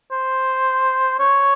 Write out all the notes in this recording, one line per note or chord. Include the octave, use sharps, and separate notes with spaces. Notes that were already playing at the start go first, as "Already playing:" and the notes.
C5
C#5